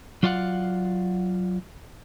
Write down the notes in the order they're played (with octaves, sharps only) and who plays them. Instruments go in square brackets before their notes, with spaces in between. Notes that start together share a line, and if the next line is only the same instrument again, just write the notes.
[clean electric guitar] F#3 F4 D5 F5 F#5